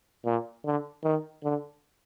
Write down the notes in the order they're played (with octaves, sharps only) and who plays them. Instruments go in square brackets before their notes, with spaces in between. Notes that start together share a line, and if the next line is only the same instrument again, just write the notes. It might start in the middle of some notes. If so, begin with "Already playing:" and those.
[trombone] A#2
D3
D#3
D3